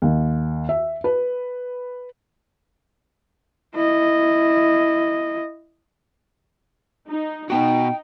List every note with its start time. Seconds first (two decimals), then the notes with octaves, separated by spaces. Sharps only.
0.02 D#2
0.69 E5
1.04 B4
3.75 E4 D#5
7.09 D#4
7.50 B2 B3 D#4 F#4 G5